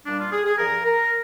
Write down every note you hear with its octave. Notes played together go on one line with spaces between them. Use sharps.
A#2 G3 D4
F4
G#4
G#4
G2 F3 A#4
A#4